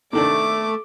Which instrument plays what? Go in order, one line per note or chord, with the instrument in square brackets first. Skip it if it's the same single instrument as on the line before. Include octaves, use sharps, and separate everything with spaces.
[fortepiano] C3 D#3 D4 [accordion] A3 [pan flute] A4 [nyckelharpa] D6